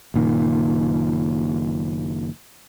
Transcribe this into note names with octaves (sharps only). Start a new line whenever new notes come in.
F#1 A#2 D#3